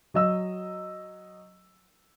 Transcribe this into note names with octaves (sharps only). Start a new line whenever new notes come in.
F#3 D#5 E6